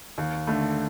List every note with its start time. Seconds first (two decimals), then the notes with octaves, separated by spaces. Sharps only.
0.18 D#2
0.47 D3 A3